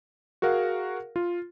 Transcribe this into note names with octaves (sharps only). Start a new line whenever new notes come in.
F#4 G#4 A#4 F5 F#5
F4